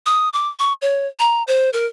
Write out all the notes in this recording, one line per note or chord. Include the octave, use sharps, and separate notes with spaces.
D#6
D6
C#6
C#5
A#5
C5
A#4